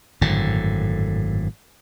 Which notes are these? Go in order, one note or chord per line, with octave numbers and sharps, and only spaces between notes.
G#1 F#2 A2 D3